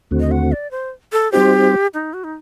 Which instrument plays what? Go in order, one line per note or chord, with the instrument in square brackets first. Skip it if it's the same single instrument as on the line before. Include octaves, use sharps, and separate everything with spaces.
[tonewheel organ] D#2 D3 A3 C4 F#4
[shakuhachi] D#5
F#5
D5
C5
A4
[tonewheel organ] G3 C4 D#4 F#4 C5 [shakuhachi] G4
[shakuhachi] D#4
F#4
D#4